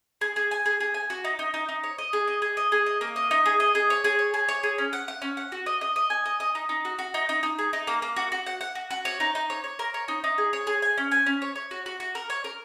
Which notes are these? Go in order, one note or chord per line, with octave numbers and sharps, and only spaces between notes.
G#4
G#4
G#5
G#4
G#4
G#5
F#4
D#4
D#4
D#4
D#4
C#5
D#5
G#4
D#5
G#4
D#5
G#4
D#5
A#3
D#5
D#4
G#4
D#5
G#4
C#5
G#4
C#5
G#4
C#5
G#4
C#4
F#5
F#5
C#4
F#5
F#4
D#5
D#5
D#5
G#5
D#5
D#5
D#4
D#4
F#4
F#4
D#4
D#4
D#4
G#4
D#4
A#3
A#3
F#4
F#4
F#5
F#5
F#4
F#4
C#5
D#4
D#4
C#5
C#5
A#4
C#5
D#4
D#4
G#4
C#5
G#4
G#5
C#4
G#5
C#4
C#5
C#5
F#4
F#4
F#4
A#4
C#5
A#4